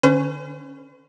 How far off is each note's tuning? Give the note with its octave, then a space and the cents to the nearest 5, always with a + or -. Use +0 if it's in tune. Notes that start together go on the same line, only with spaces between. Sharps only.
D3 +15 C#4 -5 C5 -45